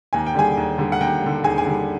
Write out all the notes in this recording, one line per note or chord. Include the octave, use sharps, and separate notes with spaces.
D#2 G#5
G5
D3 G3 G#4 G#5
D#2
D3 G3
F#5
D#2 G5
D3 G3
D#2 G#4 G#5
G#4 G#5
D3 G3